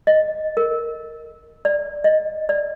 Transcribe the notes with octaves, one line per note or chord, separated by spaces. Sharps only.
D#5
A#4
D5
D#5
D5